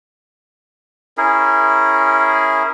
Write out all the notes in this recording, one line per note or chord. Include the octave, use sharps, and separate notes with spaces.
C#4 E4 G#4 A#4